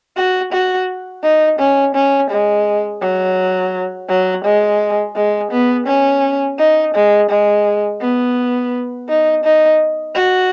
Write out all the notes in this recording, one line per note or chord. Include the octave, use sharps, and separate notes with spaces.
F#4
F#4
D#4
C#4
C#4
G#3
F#3
F#3
G#3
G#3
B3
C#4
D#4
G#3
G#3
B3
D#4
D#4
F#4